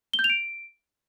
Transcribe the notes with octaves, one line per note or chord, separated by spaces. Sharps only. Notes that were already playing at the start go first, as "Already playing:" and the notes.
G7
G6
F7
D7